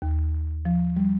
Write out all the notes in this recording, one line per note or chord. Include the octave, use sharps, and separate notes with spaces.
D#2
F3
G3